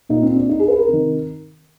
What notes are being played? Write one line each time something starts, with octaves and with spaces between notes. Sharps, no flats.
A#2 D#4
C4
D4
D#4
G#4
B4
A#4
C3 D#3